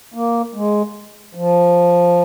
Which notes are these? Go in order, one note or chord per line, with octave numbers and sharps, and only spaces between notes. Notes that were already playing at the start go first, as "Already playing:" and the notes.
A#3
G#3
F3